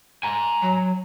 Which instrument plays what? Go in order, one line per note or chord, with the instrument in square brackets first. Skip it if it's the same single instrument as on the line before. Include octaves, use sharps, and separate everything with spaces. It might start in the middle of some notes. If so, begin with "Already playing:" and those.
[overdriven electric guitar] G#5 A#5
[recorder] F#3